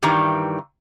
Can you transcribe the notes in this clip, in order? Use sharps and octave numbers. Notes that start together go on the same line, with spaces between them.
G2 D#3 E3 G3 A#5